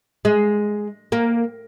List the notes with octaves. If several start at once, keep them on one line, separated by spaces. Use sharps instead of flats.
G#3
A#3